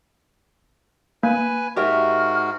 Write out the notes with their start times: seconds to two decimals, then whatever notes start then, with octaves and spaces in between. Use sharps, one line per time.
1.23 A#3 B4 G#5
1.76 G#2 F#4 G4 A#4 E5 F6